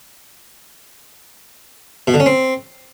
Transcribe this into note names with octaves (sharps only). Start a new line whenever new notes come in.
B2
D3
C#4
C4